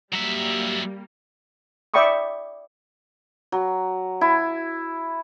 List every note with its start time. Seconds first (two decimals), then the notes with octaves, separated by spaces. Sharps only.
0.13 F#3 G3 A#3 E5
1.94 D5 E5 G5 B5 C#6 D#6
3.52 F#3
4.21 E4